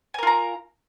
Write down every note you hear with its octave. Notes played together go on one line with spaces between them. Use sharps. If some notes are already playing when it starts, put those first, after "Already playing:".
F4 A#4 G#5 A#5